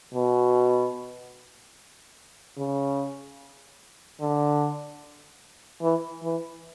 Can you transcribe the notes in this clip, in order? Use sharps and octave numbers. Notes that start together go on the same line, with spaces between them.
B2
C#3
D3
E3
E3